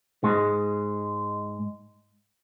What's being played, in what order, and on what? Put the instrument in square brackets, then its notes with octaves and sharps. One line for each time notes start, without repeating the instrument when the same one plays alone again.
[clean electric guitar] G#2 G#3